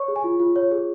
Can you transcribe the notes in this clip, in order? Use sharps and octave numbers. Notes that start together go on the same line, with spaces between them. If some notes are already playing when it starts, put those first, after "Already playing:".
Already playing: C#5 C#6
G#4
G#5
F4
F4
C#5
G#4